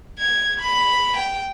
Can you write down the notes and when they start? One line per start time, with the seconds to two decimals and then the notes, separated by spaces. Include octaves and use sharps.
0.19 G#6
0.60 B5
1.17 G5